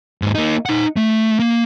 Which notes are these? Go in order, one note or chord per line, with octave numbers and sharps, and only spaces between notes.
D#2 G#2
A#3 D#4
D#4 F#5
A3
A#3